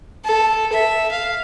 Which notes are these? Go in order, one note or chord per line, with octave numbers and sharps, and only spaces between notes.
A4
E5
F5